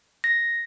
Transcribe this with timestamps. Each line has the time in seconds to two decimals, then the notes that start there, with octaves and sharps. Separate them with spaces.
0.24 A#6